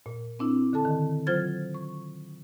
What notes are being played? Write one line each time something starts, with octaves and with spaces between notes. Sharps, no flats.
A#2
C4 D4 E4
D3 A4 A5
D#3
F#3 F4 C5 F6 G#6 A6
C#6